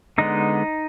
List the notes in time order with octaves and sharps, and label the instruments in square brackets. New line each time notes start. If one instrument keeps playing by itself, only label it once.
[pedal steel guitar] D3 G#3 B3 D#4